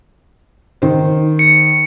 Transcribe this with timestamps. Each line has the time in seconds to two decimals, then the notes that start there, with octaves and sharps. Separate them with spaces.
0.82 D#3 C5
1.39 C#7